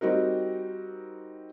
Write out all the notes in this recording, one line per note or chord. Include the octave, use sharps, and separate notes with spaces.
G3 C4 D#4 F#4 A#4